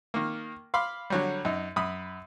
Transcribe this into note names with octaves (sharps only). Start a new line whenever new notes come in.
D#3 A#3
F5 B5 C6 D6
D3 F#3 G3
F#2 D#4
F#2 B5 D#6